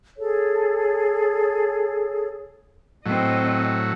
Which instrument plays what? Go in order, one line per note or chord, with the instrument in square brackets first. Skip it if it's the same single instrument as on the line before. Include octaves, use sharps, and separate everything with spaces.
[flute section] G#4 A4 C#5
[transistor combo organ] A2 F#3 [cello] C4 D#5